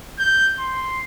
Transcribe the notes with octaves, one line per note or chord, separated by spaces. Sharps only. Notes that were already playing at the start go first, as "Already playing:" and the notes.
G6
C6